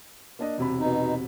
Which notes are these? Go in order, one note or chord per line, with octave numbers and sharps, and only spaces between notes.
A#3 D4 D#5
E1 C3 B5
B2 D#4